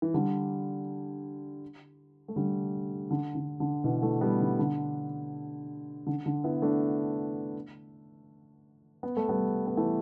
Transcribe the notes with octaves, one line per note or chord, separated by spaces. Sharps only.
E3
D3 G3
A3
D3 G3
D3
D3
D3
B2 E3
E3 A3
G3 B3
D3
D3
D3
D3
B3 E4
A3 D4
B3
A3
G3 B3
B3
E3 A3